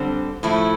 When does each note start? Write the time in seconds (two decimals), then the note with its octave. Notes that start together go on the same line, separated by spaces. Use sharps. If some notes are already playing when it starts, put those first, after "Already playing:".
Already playing: D3 G3 C4
0.43 A2 F3 A3 E4